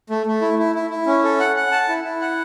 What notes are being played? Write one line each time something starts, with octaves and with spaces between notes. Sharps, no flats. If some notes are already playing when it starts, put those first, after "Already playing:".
A3
A3
E4
E4
E4
E4
C#4
A4
F#5
F#5
A5
E4
E4
F#5